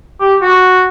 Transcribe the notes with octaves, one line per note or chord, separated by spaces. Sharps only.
G4
F#4